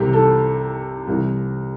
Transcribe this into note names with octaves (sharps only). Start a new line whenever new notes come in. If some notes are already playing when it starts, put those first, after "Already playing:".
Already playing: C2 C3 E3 G4
A4
C2 C3 E3